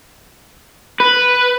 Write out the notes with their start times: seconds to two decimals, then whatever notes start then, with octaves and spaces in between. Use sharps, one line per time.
1.00 B4